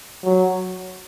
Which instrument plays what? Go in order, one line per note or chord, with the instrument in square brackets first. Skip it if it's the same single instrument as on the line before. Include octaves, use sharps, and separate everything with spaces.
[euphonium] F#3